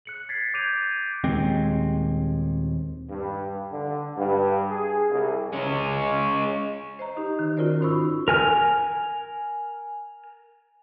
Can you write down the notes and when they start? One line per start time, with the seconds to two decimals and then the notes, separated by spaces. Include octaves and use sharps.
0.06 F#6 C#7 F#7
0.29 G#6 A6 B6 C7
0.54 D6 G6 G#6 D7 D#7 F7
1.23 D#1 D#2 G#3 C4
3.10 G2
3.72 D3
4.16 G2
4.70 G#4
5.10 C2
5.52 G#3 C#4
6.99 C5 D#5 A#5
7.17 D#4 G4
7.39 D#3
7.57 C#4 F4 F#4 A#4 C5 D5
7.81 G#2 D#4 C5 B5 C#6 E6
8.28 A#4 G#5 F6